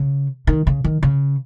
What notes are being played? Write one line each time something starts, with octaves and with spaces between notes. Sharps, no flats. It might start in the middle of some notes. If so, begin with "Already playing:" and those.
Already playing: C#3
D#3
C#3
D#3
C#3